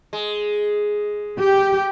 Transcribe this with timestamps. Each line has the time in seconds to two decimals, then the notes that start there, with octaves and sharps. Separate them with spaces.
0.13 G#3
1.40 G4